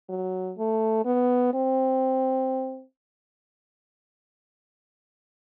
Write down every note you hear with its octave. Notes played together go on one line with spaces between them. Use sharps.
F#3
A3
B3
C4